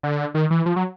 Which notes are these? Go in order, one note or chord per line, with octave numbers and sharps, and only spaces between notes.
D3
D#3
E3
F3
F#3